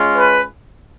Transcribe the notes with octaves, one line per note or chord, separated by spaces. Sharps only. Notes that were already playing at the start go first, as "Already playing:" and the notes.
Already playing: G#3 C#4 F4
B4